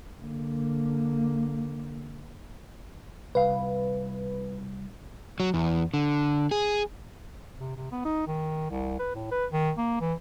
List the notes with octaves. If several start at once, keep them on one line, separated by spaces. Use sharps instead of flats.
D3 A#3
C2 B4 F5
F#3
E2
D3
G#4
C3
C3
B3
D#4
D#3
C2
B4
A2
B4
D#3
A#3
E3